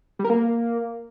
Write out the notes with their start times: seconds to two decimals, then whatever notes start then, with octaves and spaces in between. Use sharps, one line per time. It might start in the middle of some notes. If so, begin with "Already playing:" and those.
0.19 G3
0.25 A#4
0.30 A#3